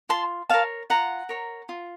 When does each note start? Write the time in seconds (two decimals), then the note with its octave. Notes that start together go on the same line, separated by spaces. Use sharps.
0.09 F4 A5 C6
0.50 A#4 C#5 F5 A5
0.90 F4 F#5 A#5
1.29 A#4 C#5
1.69 F4